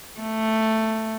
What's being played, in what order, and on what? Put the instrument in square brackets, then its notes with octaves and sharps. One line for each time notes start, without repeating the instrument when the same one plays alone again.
[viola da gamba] A3